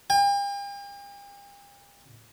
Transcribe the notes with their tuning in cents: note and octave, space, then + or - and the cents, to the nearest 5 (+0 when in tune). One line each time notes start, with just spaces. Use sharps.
G5 +45